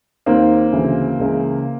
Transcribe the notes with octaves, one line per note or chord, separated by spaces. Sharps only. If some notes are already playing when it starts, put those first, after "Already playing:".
D#2 D#3 A#3 C4
D2 C#3 E3
C#2 C#3 E3